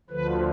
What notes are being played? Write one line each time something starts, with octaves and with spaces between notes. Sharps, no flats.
D2 D3 F3 B4